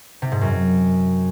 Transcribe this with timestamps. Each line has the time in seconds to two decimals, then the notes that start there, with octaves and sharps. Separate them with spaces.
0.22 C3
0.32 G#2
0.41 F#2